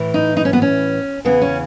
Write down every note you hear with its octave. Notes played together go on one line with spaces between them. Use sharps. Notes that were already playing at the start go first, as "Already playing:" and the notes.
Already playing: A2 E3
D#4
D#4
C#4
B3
C#4
E2 C#3 E3 B3
C#4